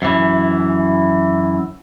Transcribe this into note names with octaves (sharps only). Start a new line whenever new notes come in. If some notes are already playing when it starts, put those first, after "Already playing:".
F#2 E3